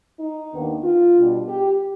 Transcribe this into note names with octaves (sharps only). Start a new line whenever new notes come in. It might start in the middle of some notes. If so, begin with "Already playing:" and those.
D#4
D#2 D#3 B3 D4
F4
B2 G3 D4
G4